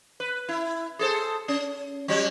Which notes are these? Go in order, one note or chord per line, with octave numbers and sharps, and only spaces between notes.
B4
E4
G#4 A4 C5
C#4
F#3 G3